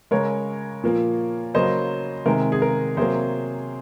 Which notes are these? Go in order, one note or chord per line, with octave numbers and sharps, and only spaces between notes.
C#3 G#3 A#4 C#5
A#2 F3 A#3
C#3 F#3 A#3 C5 D#5
C3 D#3 G#3 A#4
G#4
A#4
C3 F#3 A#3 G#4 C5